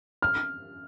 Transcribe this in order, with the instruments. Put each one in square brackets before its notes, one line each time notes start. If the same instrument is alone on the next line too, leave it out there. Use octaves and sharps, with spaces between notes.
[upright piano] F6